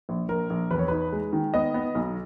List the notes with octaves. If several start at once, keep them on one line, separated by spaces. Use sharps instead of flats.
A#1
A#1 A#4
A#1
E2 B4
C#5
D#4 B4
G#3
D#3
B3 D#5
B3
B1